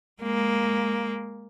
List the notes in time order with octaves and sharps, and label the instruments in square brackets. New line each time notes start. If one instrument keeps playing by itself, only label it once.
[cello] G#3 A#3